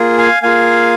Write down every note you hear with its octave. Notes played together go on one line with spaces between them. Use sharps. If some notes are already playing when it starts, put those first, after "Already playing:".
Already playing: A#3 F4 G#4
F5 G#5
A#3 F4 G#4 F5 G#5